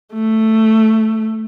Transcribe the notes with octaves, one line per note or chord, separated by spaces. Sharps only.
A3